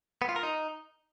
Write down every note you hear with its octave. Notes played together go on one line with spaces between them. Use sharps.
B3
F4
A#4
D#4